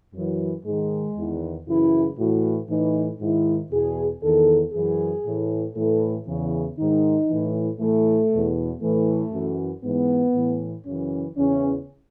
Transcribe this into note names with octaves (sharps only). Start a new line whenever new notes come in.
F#2 E3 F#3
G#2 D#3 G#3
E2 D#3
F#2 C#3 E3 E4
A2 E3 F#4
A2 E3 D#4
G#2 D#3 E4
E2 B2 G#4
E2 D#3 A4
F#2 E3 G#4
A2 E3
A2 E3 A4
E2 C#3 E3
G#2 D#3 D#4
E3
A2
A2 E3 A3
E2 B2
A2 E3 A3
F#2 E3
G#2 E3 B3
A2 E3
F#2 C#3 E3 C#4
E2 C#3 E3 C#4